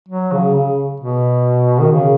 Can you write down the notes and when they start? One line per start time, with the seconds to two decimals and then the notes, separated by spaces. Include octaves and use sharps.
0.09 F#3
0.33 C#3
0.55 C#3
1.00 B2
1.81 D#3
1.93 C#3